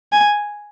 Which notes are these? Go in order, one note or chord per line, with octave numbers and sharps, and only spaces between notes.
G#5